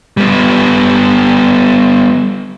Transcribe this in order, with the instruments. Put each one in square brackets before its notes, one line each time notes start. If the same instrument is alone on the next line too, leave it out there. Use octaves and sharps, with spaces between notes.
[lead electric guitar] G3 B3